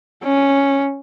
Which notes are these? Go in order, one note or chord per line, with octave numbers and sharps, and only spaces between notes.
C#4